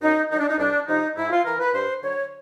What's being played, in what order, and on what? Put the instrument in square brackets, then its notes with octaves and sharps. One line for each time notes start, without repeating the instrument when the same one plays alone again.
[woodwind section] F#2 D#4
D#3 F#3 D#4
D4
D#4
C2 D4
C3 F3 D#4
G#2 E4
F4
E3 A#4
B4
G2 C5
D3 F#3 C#5